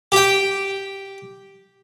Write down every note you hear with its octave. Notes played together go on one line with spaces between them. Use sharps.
G4 G5